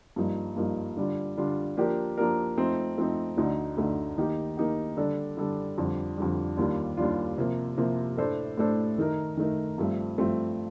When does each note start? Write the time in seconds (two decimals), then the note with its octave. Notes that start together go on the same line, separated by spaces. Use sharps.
0.16 G2 F3 A#3 D#4
0.56 G2 F3 A#3 D#4
0.97 D3 G3 D4 F4
1.37 D3 G3 D4 F4
1.77 F3 A#3 D4 G4 A#4
2.18 F3 A#3 D4 G4 A#4
2.57 F3 A3 C4 D#4
2.97 F3 A3 C4 D#4
3.37 D2 D3 A3 D#4
3.77 D2 D3 A3 D#4
4.18 D#3 A#3 D#4 G4
4.57 D#3 A#3 D#4 G4
4.97 D3 G3 D4 A4
5.37 D3 G3 D4 A4
5.78 F2 D3 G3
6.17 F2 D3 G3
6.57 D#2 D#3 G3 D4 F4
6.97 D#2 D#3 G3 D4 F4
7.38 C3 F3 A#3
7.78 C3 F3 A#3
8.17 A2 A3 D4 A4 C5
8.57 A2 A3 D4 A4 C5
8.98 D#3 A3 D#4 A#4
9.37 D#3 A3 D#4 A#4
9.78 G2 F3 A3 C4 F4
10.18 G2 F3 A3 C4 F4